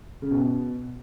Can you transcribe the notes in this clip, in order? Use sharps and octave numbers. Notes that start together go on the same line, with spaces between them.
C#3
B2